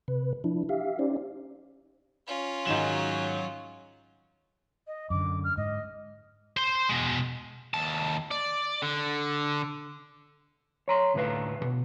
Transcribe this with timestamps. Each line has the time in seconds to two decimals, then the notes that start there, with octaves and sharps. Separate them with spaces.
0.08 C3 B4
0.44 F3 D4 E4
0.69 G4 E5 F5
0.99 C#4 D#4 G4 C5 D5
2.27 C#4 F4
2.67 G#2 D#3 F#3 E7
4.87 D#5
5.10 F#2 D3 D6
5.44 F6
5.57 G#2 D#5
6.57 C5 C6
6.89 B2 G#3
7.74 D#2 A5
8.31 D5
8.82 D3
10.88 C#5 A#5 C6
11.14 D2 A2 A3 B4 F5
11.60 D2 B2